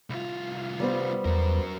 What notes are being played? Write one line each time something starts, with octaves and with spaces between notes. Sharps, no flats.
C2 F4
G3 B3 C5
E2 F#3 A#4